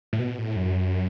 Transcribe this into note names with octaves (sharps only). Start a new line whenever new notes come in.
A2
B2
A2
F#2